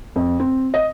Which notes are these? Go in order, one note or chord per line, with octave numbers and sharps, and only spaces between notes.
F2
C4
D#5